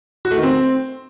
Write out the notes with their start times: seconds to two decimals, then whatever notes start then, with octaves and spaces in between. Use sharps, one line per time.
0.25 F#4
0.31 A3
0.37 D#3
0.43 C4